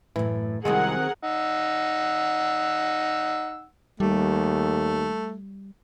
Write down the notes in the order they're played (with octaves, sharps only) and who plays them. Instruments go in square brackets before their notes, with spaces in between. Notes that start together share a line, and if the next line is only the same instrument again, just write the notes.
[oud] F#2 A2 [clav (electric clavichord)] E3
[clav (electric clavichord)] C2 G#3 [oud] D#3 F#3 C4 [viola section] G#4 A#4 F#5
[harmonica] D#4 F#5 E6
[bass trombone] D#2 [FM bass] G3 [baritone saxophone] A3